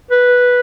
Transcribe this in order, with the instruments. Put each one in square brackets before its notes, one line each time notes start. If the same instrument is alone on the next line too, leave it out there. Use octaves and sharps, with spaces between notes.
[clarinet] B4